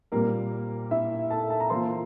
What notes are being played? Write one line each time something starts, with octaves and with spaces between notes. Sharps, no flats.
A#2 G3 A#3 C4 A#4
E4 E5
A4 A5
A5
A#5
E3 A#3 F4 C5 C6